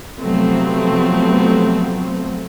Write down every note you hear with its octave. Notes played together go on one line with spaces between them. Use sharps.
C3 F3 F#3 A3 B3 C4